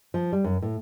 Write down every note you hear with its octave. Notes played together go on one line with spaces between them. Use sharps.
F3
G3
F#2
A2